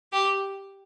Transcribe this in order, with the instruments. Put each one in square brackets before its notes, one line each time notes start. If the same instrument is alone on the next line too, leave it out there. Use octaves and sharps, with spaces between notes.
[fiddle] G4